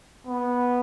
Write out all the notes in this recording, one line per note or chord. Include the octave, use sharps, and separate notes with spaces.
B3